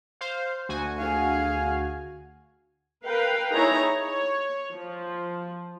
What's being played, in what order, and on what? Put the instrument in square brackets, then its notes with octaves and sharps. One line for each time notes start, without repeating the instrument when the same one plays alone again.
[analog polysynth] C5 F5
D2 F#4 G#5
[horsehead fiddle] G#4 F5
[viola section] A#4 B4 F5 G5
D#4 E4 G#4 C#5 A#5
C#5
F3